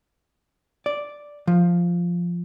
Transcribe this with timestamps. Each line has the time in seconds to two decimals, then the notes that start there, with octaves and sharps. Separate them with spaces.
0.86 D5
1.48 F3